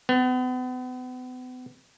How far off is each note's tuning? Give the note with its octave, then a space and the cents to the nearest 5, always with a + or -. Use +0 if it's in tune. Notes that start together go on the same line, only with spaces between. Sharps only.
B3 +40